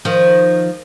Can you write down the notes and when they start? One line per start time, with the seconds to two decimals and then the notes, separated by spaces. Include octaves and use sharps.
0.05 D#3 F3